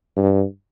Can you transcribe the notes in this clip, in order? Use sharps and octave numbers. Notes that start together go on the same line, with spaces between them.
G2